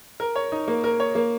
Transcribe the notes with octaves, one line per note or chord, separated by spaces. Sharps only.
A#4
C#5
D#4
A#3
A#4
C#5
A#3